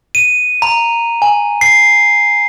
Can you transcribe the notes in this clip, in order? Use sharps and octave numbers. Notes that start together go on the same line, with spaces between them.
D#7
A#5
G#5
C7